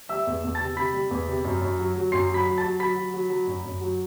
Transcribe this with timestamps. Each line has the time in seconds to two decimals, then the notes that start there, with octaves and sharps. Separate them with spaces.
0.09 G3 E5 E6
0.27 E2
0.44 E2
0.55 A5 A6
0.60 C3
0.77 C3 B5 B6
0.94 G3
1.11 E2
1.28 C3
1.45 F#2
1.62 F#2
1.79 F#3
1.96 F#3
2.12 F#2 C6 C7
2.29 F#3
2.34 B5 B6
2.46 F#3
2.58 A5 A6
2.63 F#3
2.80 F#3 B5 B6
2.96 F#3
3.14 F#3
3.30 F#3
3.47 F#2
3.65 F#2
3.81 F#3